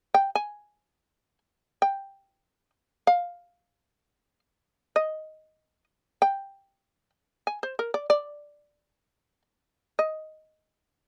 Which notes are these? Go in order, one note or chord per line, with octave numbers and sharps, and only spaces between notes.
G5
G#5
G5
F5
D#5
G5
G#5
C5
A#4
D5
D5
D#5